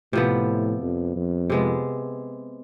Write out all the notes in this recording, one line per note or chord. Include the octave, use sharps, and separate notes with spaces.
A2 C3 F3 B3
F2
F2
C3 G#3 B3